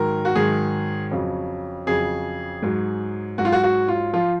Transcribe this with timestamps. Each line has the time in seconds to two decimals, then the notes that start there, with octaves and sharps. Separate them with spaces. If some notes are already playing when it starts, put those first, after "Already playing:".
Already playing: G#2 D#3 F#3 A#4
0.25 F#4
0.36 G#2 D#3 F#3 G#4
1.11 F2 C#3 F#3
1.87 F2 C#3 F#3 G#4
2.63 G#2 F#3
3.38 G#2 F#3 F#4
3.45 F4
3.52 F#4
3.63 F#4
3.88 F4
4.14 F3 F4